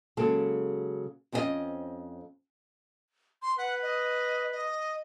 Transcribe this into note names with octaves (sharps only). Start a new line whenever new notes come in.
C#3 F#3 G#3 A#3 A4
F2 C4 C#4 G#4 D#5
C6
B4 F#5
D#5
D#5